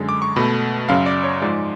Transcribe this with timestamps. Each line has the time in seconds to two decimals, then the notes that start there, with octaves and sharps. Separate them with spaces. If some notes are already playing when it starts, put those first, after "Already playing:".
Already playing: F#2 D3 G#3
0.09 D6
0.22 C#6
0.36 B2 A3 B5
0.89 F#2 C#3 F#3 F5
1.06 D5
1.24 C#5
1.42 G#2 F3 G#3 D5